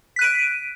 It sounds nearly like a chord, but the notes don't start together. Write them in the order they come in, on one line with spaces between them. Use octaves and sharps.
B6 F#6 D#7 D7